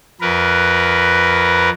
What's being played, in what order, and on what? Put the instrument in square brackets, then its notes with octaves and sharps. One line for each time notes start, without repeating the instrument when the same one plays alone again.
[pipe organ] F2 A#4 B4